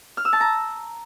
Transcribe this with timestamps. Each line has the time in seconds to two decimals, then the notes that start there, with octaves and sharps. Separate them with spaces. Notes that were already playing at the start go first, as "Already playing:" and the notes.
0.17 F6
0.25 E6
0.33 A5
0.40 A#5